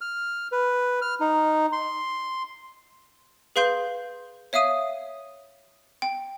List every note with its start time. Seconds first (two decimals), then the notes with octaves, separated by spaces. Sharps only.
0.01 F6
0.52 B4
1.02 F6
1.20 D#4
1.72 C6
3.56 G#4 B4 F5 C6 G6
4.53 C#5 E5 F5 D#6 D#7
6.02 G5